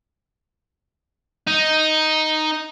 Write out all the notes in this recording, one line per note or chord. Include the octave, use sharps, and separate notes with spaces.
D#4